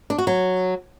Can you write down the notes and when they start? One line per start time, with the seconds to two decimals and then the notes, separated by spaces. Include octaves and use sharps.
0.10 D4
0.18 F#4
0.27 F#3